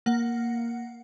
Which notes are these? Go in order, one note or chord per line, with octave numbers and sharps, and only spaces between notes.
A#3 F#5